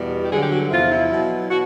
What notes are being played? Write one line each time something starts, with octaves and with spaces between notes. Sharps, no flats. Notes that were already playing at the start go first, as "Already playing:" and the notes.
Already playing: E2 B2 G3
G4
G2 D3 F#3 G#4
G4
F#4
E2 C3 F3 F4
E4
B2 F#3
B2 F#4